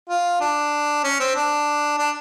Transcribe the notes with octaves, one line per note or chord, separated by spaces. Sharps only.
F4
D4
C#4
C4
D4
D4